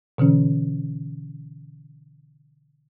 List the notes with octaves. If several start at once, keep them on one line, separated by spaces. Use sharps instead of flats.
B2 D3 E3 C#4